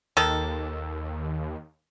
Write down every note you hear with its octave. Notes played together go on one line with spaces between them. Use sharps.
D#2 D#3 A4